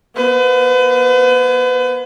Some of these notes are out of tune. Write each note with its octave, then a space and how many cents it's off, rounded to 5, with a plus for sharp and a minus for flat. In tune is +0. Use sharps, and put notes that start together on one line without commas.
B3 -40 B4 +40